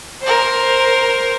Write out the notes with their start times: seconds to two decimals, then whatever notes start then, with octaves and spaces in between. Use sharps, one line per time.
0.22 A#4 C5